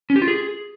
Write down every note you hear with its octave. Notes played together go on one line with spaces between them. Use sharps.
C#4
G4
F4
G#4